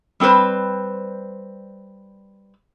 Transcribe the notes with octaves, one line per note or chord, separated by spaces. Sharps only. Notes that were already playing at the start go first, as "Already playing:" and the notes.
G3 C4 A4 B4 C5